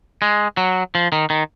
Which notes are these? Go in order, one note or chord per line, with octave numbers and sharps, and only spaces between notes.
G#3
F#3
F3
D#3
D#3